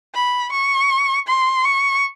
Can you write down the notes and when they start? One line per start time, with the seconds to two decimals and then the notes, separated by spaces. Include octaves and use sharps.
0.14 B5
0.52 C#6
1.28 C6
1.65 C#6